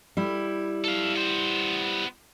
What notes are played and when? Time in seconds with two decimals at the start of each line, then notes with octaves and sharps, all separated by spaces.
0.17 G3 E4
0.84 A4 F5
1.15 B3 C5